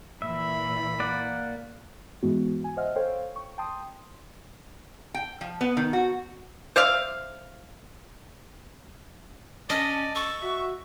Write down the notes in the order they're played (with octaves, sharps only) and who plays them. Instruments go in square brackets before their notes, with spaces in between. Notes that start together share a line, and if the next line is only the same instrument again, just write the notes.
[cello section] A#2 E3 [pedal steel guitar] E5 [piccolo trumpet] B5
[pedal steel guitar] A#3 D5 F#5
[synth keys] G#2 E3 G#3 B3 F#4
G#5
C5 D#5 E5 F#5 F6
A4 C5 C#5 F5 G5
C#6
G5 A5 C6 D#6
[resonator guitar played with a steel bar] G5
F3
B3
D#3
F#4
[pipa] C5 D5 E5 F5
[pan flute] C#4 [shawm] D5 [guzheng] D#5 [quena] A5
[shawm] A4 [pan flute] C#6
[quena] F#4 [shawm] E5